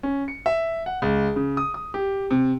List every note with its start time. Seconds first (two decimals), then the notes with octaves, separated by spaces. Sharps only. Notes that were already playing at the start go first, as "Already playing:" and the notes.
0.03 C#4
0.28 C#7
0.46 E5
0.86 F#5
1.02 C#2
1.36 C#3
1.57 D#6
1.74 D#6
1.94 G4
2.31 C3